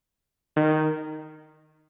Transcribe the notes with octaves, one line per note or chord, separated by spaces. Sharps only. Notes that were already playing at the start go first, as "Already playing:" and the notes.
D#3